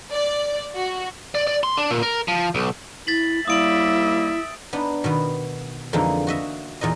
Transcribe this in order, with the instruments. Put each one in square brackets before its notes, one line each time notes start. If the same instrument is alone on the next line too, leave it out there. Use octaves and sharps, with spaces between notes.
[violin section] D5
F#4
[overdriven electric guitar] D5
D5
C6
D4
A#2
A#4
F3
B1
[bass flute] E4 [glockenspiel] A6 B6 F#7
[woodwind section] D#2 G3 A#3 [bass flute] E4 [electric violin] E5 [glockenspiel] D#6 D7 F#7
[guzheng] B3 D4 D#4
B2 D#3 B3
F2 D3 E3 G#3 A#3 D#4
F#4 D#5 E5
E2 A#2 D#4 D#5